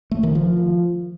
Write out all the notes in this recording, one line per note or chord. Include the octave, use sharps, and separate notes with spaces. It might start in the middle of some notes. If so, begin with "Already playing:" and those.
A3
D#3
F3